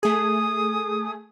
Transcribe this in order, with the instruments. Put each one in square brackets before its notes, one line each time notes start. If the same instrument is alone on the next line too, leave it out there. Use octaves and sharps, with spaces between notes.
[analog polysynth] A3 G#4 [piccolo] D#6